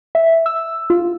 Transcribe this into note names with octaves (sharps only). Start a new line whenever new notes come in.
E5
E6
F4